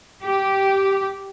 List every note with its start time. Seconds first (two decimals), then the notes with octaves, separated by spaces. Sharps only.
0.23 G4